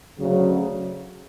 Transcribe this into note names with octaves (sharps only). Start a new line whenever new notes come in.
D2 C#3 F#3